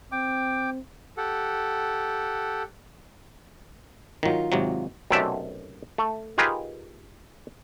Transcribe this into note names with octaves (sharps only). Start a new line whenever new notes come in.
C4 G5 D6
G4 A4 F#5
D#3 F#3 D#4 F4
G#1 C3 F#3
B1 F#2 C3 A3 D5 E5
A3
D#4 F4 G4 G#4 A#4 B4